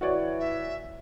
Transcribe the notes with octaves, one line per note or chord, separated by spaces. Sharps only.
E3 F#4 C#5 D5
E5